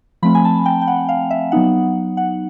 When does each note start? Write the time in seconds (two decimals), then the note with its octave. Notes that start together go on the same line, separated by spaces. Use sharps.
0.23 F3 A3 C4 B5
0.35 G#5
0.45 A5
0.66 G5
0.82 G5
0.87 F#5
1.09 F5
1.30 E5
1.52 F#3 B3 D#4 F#5
2.17 F#5